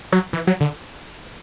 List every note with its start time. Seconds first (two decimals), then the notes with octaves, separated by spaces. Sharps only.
0.12 F#3
0.33 E3
0.47 F#3
0.61 D3